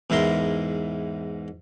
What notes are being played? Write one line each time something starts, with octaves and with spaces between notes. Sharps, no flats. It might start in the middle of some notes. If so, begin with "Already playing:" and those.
E2 G#2 E4 A#4 C6